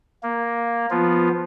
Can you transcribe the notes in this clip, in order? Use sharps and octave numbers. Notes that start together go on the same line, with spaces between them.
A#3
F3 B3 F4